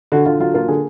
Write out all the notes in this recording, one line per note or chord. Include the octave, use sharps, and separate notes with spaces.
D3 F#4
D3 F4
F#3 F4
A#3 F4
D3 G#4